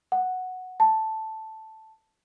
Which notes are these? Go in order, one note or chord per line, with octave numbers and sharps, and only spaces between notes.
F#5
A5